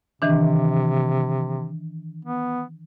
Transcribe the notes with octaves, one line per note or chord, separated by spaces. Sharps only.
C3 D#3 E3 D4
B3